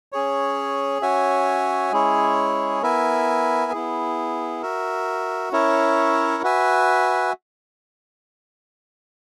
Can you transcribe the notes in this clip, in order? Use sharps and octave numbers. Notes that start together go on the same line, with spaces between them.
C#4 G#4 C#5
C#4 F#4 C#5 E5 G#5
G#3 C#4 E4 G#4 C#5
B3 E4 A#4 E5 G#5
B3 E4 G#4
F#4 A#4 E5
C#4 E4 A#4 C#5 E5
F#4 B4 E5 G#5